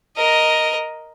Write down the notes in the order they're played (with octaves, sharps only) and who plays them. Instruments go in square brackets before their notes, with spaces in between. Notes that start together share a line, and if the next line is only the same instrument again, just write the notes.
[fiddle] A#4 D#5